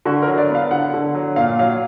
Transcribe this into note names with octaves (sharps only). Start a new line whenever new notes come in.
D3 F#4
A#4
F#3
D5
B3
F5
D3 F#5
D3
F#3
A#2 F5
F#3 F5